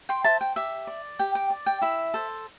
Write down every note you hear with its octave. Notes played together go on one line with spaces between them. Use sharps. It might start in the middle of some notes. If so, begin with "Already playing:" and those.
G5 C6
C5 E5 A5
G5
G4 E5
D5
G4 G5
G5
D5
G5
E4 E5
A4 C5